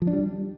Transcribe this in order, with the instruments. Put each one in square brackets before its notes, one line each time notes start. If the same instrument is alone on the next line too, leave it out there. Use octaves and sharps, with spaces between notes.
[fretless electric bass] F3
D4
G3